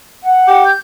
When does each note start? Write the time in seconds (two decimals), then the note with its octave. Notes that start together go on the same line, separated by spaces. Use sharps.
0.23 F#5
0.48 G4
0.65 G6